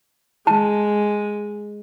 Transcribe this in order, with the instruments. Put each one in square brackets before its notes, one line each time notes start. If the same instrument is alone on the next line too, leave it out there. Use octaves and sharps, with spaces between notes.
[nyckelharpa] G#3 [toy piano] A5